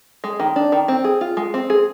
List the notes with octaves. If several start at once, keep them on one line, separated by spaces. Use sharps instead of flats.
G#3
D#3
D4
D#3
C4
G#4
F4
G#3
C4
G#4